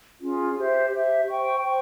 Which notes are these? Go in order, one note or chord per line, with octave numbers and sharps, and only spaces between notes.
C#4 F4 G#4
G4 C5 E5
G4 C5 E5
C5 G5 C#6
C5 G5 C#6